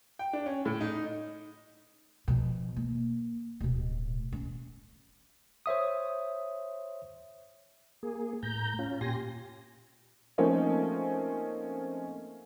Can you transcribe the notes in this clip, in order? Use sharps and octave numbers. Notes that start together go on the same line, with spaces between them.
G5
D4
C#4
A2
D#4
B2 F3
A#3
D1 B2
C#4
C5 C#5 E5 D#6
A#3 G#4
A2 A#5 G6
C#4 F4
A#2 G4 G#5 C6 A#6
F3 A3 A#3 C4 C#4 D#4